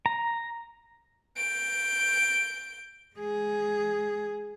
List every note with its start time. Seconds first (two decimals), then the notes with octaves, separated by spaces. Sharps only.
0.06 A#5
1.37 G6 D7
3.16 G#3 G#4